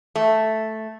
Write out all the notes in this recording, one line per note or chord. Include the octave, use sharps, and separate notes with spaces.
A3